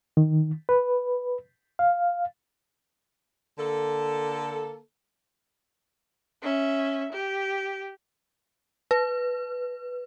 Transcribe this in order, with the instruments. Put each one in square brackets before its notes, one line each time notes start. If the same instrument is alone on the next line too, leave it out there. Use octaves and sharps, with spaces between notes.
[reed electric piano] D#3
B4
F5
[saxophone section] D3 A#3 A4
[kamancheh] C#4 E5
G4
[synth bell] B4